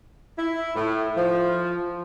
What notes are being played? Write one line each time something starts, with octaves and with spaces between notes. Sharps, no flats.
E4
A2
F3